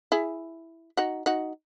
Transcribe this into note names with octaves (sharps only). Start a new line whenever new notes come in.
E4 G#4
D#4 F#4
D#4 F#4